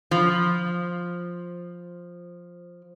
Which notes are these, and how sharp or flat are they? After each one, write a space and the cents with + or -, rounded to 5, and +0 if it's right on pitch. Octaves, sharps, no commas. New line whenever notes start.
F3 +5